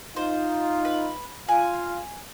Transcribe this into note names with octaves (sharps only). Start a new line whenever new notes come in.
D#4 F4 C5
B4
F4 F5 G#5 F#6